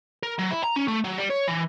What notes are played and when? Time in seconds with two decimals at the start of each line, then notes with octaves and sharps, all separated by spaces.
0.23 A#4
0.39 F#3
0.52 E4
0.64 A#5
0.76 C#4
0.88 A3
1.04 F#3
1.18 G3
1.30 C#5
1.47 E3